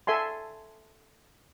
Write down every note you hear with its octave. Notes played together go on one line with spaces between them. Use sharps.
A4 E5 G#5 C6